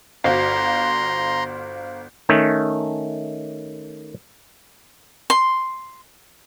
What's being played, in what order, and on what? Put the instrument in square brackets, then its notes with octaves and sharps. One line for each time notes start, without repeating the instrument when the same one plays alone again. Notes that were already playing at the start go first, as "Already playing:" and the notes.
[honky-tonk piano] G1 F#4 [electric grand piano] C5 F5 [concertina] A#5 C6
[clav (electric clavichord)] D#3 A3 C#4
[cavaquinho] C6